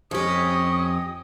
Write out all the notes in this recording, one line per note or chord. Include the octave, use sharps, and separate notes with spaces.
F2 C#4 G4 D#5 D#6